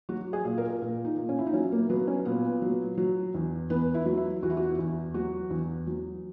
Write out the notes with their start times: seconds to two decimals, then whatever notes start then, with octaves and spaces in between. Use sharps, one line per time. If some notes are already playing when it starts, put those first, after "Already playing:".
0.09 F#3 F#4
0.33 G#4
0.45 A#2
0.58 A#4
0.82 A#2
1.05 D#4
1.17 A#2
1.29 C#4
1.39 E4
1.47 D#4
1.54 F#3 C#4
1.72 A#3
1.90 F#3 B3
2.07 C#4
2.25 A#2 B3
2.62 F#3
2.98 F#3
3.34 E2
3.70 E2 B3
3.94 E4
4.05 F#3
4.17 E4
4.43 E2 F#4
4.50 E4
4.57 F#4
4.79 E2
5.14 F#3 F#4
5.50 E2
5.87 F#3